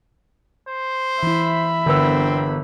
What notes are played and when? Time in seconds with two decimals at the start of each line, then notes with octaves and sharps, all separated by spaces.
0.67 C5
1.23 E3 E4 E5 B5
1.86 G1 D3 B3 C4 A#4 E6